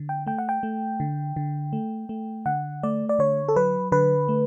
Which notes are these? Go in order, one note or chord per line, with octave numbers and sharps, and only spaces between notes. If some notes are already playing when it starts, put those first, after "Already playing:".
Already playing: D3
G5
A3 G5
F#5
G5
A3
D3
D3
A3
A3
D3 F#5
A3 D5
D5
D3 C#5
A4
F#3 B4
D3 B4
A3